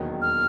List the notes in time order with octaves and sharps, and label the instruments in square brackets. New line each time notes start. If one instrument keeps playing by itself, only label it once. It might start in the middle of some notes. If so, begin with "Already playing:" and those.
Already playing: [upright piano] E1 D#2 D#3 F#3 B3
[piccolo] F6